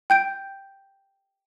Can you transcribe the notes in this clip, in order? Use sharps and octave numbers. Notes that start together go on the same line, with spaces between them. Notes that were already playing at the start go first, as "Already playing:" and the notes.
G5 G6 D7